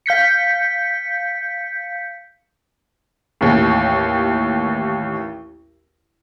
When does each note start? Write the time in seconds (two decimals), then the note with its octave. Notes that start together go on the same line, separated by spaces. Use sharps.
0.06 F5 G6 B6 C#7
3.41 A1 D#2